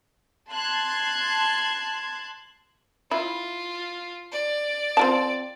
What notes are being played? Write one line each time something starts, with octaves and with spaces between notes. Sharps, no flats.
A5 C6 F#6 G#6
E4 F4
D5
C4 F4 A5